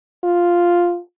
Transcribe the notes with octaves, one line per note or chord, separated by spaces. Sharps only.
F4